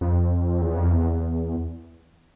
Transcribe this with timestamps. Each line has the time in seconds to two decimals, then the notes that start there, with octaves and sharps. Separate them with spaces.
0.01 F2
0.61 E2
0.76 F2
0.92 E2